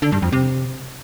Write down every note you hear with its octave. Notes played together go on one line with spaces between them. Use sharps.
D3
G2
F2
C3